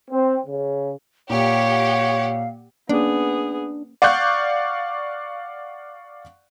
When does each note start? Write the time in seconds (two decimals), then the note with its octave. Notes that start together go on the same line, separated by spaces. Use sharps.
0.11 C4
0.46 C#3
1.30 A#2 G4 C#5 F5 F#5
2.89 A#3 B3 C#4 D4 G#4
4.02 D5 F5 F#5 C#6 F#6 G6